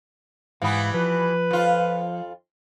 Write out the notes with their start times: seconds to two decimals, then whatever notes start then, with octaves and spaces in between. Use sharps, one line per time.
0.62 G#2 E3 G3 B3 F5
0.94 F3 B4
1.51 F2 F4